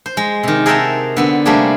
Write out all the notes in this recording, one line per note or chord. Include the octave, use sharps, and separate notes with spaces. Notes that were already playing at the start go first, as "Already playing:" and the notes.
C5
G#3
C3 D#3
G#4 A#4 E5 F#5 G5 A5
D3 B3 C4
C3 G3 A3 A#3 D4 G#4